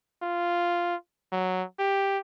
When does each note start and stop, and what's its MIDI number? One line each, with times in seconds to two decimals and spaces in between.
0.22 0.95 65
1.32 1.64 54
1.79 2.18 67